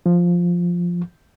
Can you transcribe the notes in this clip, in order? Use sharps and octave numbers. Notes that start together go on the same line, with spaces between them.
F3